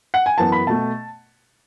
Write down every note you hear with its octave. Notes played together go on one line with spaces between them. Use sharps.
F#5
G#5
F#2 E3 B3 A5
B5
B2 A3 A5